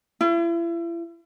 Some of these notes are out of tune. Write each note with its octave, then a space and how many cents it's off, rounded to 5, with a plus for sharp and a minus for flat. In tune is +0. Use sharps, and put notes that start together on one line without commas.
E4 +40